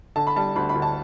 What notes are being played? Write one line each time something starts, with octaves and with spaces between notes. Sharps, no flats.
D3 A5
B5
G3 A5
D2 B5
B5
D2
A5